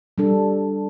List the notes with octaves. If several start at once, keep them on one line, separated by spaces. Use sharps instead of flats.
G3 D4 A4